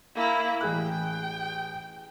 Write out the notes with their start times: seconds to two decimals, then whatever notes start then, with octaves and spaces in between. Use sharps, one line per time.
0.15 A#3 E4
0.61 A1 G#4 G5 F#6